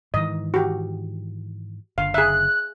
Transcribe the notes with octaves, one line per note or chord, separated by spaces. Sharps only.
G#2 D#3 E3 D#5
F#4 G4
F#1 D3 F5
G#4 E5 F#6